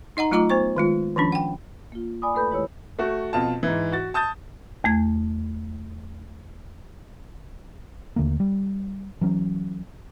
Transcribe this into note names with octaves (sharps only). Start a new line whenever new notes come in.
D#4 D#5 F#5 A#5
F#3 A3 F4 D#5 A#5 D6
B3 C5 C#6
D#3 G#3 F4
D#3 F3 C#4 D4
F#5 G5
A#3 F4
D5 G#5 B5 D6 D#6
D#2 A3 A4 B4 B5 G6
D#3 G#3 E4 G4 C#5 E6
A3 F#4
F2 B2 F4 A5
G#2 E3
F#4 A6
A5 D#6 G6 A6
E2 A3 G#6
D#2 D3 A3 A#3
G3
E3 F#3 C#4